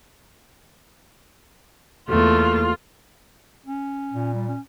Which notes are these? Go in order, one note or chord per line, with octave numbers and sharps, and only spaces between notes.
E2 A3 A#3 F4
C#4
A#2
G3
C#4